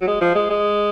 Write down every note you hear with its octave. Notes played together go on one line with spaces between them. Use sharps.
F#3
G#3
F3
G#3
G#3